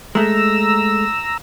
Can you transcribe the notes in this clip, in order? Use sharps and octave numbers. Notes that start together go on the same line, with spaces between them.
G#3 A3 A#5 E6